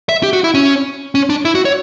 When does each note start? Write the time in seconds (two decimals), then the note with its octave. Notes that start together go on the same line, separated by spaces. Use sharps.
0.09 E5
0.23 G4
0.33 F#4
0.44 E4
0.54 C#4
1.15 C#4
1.30 D4
1.45 E4
1.55 F#4
1.65 C#5